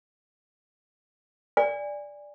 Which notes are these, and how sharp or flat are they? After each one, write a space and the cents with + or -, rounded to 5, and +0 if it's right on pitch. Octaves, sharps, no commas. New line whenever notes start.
D5 +0 G#5 -25